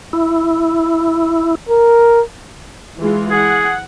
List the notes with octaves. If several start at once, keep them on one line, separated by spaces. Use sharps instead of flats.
E4
A#4
E3 G#3 F4
G#4 F#5